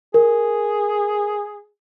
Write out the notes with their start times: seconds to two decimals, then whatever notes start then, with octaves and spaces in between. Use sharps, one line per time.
0.14 G#4 A#4